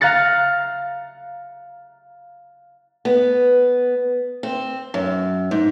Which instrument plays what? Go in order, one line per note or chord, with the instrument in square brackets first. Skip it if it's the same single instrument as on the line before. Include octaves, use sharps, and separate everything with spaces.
[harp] F5 A#5 F#6 A6 C#7
[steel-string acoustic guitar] B3
C4
F#2
G#2